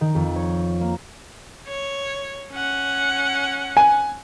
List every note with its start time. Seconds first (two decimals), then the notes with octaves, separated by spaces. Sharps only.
0.01 D#3
0.15 F2
0.36 C#5
0.81 A#3
1.67 C#5
2.51 C#4 F#5
3.77 G#5